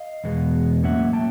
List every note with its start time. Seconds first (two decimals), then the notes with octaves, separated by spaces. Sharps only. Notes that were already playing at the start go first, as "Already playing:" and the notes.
Already playing: D#5 F5
0.24 E2 B2 G#3 B3
0.84 A2 F#3 A#3 C#4 E5 F#5
1.13 G5 A5